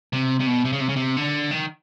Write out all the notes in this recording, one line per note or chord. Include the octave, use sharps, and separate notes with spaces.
C3
C3
B2
C3
C#3
C3
C#3
C3
D3
D#3